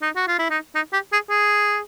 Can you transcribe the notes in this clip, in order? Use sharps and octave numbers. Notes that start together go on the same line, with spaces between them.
D#4
F#4
F4
E4
D#4
D#4
G4
G#4
G#4